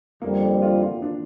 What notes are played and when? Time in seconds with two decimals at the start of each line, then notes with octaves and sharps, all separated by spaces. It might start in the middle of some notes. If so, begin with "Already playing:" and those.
0.22 F2 D3 G3 A#3 C4
0.42 A#3
0.62 F4
0.82 F4
1.02 D4